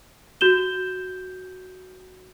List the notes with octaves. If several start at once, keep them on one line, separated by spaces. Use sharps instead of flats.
F#4 G6 E7 G7